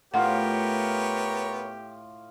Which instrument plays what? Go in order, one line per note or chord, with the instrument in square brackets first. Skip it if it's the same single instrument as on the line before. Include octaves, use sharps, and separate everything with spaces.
[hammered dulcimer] A2 F4 F5 [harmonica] B3 A#4 C#5 [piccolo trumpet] G4 [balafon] F#5